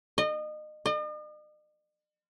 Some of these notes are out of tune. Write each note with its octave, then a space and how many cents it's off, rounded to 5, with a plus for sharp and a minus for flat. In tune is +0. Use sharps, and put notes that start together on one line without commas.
D#5 -30
D#5 -45